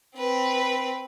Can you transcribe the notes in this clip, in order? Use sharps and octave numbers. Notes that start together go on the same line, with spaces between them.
C4 B4